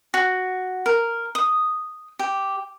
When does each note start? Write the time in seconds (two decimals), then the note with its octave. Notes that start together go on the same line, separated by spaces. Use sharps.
0.14 F#4
0.86 A#4
1.35 D#6
2.19 G4